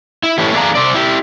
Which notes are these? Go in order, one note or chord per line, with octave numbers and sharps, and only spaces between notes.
E4
E3 A3 E4 G4 B4 C#5
E2 A3 D4 G#4 F5 A#5
C3 C4 D5
E4 G4